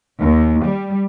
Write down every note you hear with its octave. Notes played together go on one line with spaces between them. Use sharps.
D#2
G3